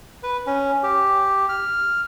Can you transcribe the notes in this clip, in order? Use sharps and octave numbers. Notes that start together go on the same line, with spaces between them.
B4
C#4
G4
F6